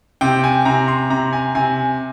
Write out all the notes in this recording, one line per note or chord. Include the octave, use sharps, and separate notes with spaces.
C3 G5
G#5
C3 A#5
C6
C3 A#5
G#5
C3 G#5